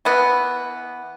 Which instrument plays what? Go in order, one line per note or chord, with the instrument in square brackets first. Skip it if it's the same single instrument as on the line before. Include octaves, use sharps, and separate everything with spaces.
[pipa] E3 B3